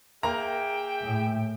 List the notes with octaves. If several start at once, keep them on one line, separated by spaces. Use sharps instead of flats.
A#3 G#4 E5 G5 A#5
A2